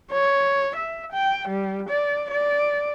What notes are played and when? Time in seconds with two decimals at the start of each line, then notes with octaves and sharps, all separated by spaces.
0.12 C#5
0.76 E5
1.12 G5
1.48 G3
1.90 D5
2.31 D5